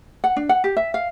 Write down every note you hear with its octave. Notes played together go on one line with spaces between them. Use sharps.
F#5
D4
F#5
G4
E5
F5